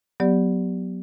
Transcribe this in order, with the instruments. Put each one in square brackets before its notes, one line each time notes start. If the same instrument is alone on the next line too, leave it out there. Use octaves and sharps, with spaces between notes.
[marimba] F#3 B3 G4 D5